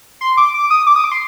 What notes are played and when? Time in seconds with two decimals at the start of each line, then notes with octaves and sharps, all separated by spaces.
0.21 C6
0.37 D6
0.54 D6
0.70 D#6
0.87 D6
0.96 D#6
1.04 D6
1.12 C6